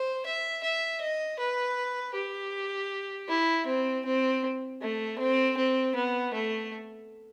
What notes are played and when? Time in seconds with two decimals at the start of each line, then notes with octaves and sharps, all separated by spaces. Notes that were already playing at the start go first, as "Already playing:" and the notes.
Already playing: C5
0.26 E5
0.63 E5
1.01 D#5
1.39 B4
2.15 G4
3.28 E4
3.66 C4
4.05 C4
4.81 A3
5.18 C4
5.57 C4
5.95 B3
6.33 A3